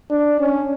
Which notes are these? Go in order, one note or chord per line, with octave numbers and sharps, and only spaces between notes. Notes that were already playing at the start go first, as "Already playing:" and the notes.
D4
C#4